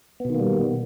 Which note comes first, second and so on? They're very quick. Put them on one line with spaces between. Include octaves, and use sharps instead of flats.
B3 B2 D#3 A#3 G3